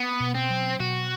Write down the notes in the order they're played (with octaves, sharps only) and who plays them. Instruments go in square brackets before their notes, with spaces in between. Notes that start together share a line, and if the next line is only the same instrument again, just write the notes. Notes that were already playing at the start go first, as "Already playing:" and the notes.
Already playing: [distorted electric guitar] B3
[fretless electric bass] B2
[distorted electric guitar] C4
[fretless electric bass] F#3
[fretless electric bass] B2 [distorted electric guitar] F#4